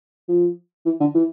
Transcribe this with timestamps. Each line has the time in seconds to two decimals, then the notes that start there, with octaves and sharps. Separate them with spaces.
0.28 F3
0.85 E3
1.00 D3
1.15 E3